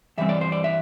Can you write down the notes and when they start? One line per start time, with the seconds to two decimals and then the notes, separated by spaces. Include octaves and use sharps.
0.18 G2 E3 G3 C4 E5
0.29 D5
0.41 C5
0.52 D5
0.64 E5